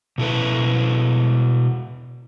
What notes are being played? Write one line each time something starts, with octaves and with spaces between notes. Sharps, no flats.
B2 E4 A4 B4